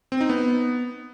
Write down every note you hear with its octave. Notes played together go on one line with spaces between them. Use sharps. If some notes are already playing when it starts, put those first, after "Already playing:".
C4
D#4
B3